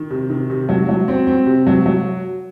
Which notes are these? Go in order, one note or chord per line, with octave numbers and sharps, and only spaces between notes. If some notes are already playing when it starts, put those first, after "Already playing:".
Already playing: D#3
C3
D#3
C3
F#3
F#3
C4
C4
C3
F#3
F#3